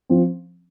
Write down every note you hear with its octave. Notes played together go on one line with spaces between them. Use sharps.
F3 C4